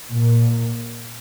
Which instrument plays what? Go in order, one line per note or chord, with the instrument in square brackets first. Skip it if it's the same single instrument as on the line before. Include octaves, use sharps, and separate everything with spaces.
[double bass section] A#2